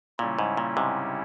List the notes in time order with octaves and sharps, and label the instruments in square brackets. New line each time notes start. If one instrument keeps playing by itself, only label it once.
[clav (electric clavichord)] A#2 [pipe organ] C#3 G3 C#4 E4
[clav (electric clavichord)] G#2
A#2
G#2 C3